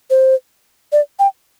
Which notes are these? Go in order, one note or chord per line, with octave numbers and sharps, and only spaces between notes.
C5
D5
G5